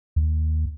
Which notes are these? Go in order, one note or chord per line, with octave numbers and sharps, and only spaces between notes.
D#2